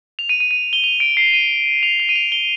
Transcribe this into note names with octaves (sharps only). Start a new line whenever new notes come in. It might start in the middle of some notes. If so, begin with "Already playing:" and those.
F7
D#7
D#7
D#7
G7
F7
D7
C7
D#7
F7
F7
D#7
F7
G7